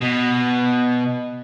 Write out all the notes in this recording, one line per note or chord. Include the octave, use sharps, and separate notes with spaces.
B2